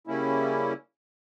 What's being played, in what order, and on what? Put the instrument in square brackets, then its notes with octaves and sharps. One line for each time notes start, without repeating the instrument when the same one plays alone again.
[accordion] C#3 G3 A#3 C#4 E4